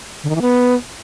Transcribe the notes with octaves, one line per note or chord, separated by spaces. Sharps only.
D3
D#3
E3
B3